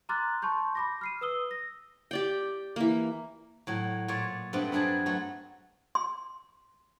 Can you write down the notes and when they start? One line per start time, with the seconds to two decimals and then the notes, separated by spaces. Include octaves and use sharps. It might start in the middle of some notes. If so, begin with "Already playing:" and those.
0.09 A#5 C6 D6 F6 F#6 A6
0.42 A5 C6 C#6 G6
0.75 B5 D6 A#6
1.01 F6 C7 D#7
1.21 B4 D#6 E6 G7
1.51 A#6
2.11 G4 D5 G5
2.76 E3 A#3
3.67 A2 F#3
4.08 A#2 C#5 D5
4.53 G2 A3 B3 C4 D4
4.72 G2 F#3 D4 G#4 G#5 A5
5.06 F#3 A3
5.95 C6